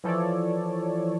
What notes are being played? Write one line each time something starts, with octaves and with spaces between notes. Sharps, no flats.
E3 F3 A4 C#5 D5